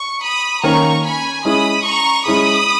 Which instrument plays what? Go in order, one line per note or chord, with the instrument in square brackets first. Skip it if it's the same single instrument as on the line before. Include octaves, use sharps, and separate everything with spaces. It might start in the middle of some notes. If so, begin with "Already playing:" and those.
Already playing: [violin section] C#6
B5 D#6
[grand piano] D#3 A#3 C#4 [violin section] A#5 C#6
[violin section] G#5 B5
[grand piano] G#3 C#4 E4 G#4 [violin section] B5 D#6
[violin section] A#5 C#6
[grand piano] G#3 C#4 E4 G#4 [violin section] B5 D#6